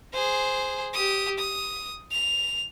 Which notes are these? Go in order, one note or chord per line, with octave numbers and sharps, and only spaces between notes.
G#4 C5
G4 D#6
D#6
F7